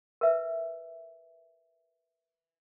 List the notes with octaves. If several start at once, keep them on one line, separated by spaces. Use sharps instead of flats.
A#4 B4 E5